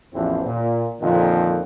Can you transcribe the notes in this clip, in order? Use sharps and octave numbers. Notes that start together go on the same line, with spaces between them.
A1 E2 E3 F3 C4 D4
A#2
F2 A#2 D3 D#3